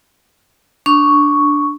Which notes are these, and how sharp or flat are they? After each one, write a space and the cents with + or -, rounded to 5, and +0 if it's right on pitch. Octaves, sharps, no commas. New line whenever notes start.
D4 +0 C#6 +5